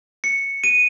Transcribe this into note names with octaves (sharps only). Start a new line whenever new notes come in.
C#7
D#7